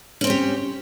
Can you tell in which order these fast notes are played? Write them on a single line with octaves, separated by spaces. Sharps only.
C#4 C4 C#5 G4